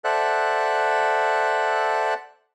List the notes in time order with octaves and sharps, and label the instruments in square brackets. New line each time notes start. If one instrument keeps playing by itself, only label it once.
[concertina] A4 C5 D5 E5 F#5 F#6